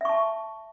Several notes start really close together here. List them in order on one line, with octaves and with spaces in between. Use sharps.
E5 C#6 A5